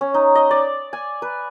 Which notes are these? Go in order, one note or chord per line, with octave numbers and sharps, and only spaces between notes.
C#4
D#4
D#5
D5
G#5
B4